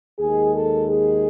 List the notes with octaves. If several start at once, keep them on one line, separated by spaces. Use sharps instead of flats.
D#2 D#3 G#3 G#4
A4
G#4